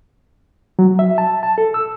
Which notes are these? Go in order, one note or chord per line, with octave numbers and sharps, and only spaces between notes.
F#3
E5
A5
A5
A4
E6